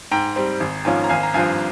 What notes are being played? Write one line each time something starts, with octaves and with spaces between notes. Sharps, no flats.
G#2 G5 A#5
G3 C4
G#1
G#2 F3 A#3 C#4
A#5
G#1 F5 G#5
A#5
G2 F3 C4 F5 G#5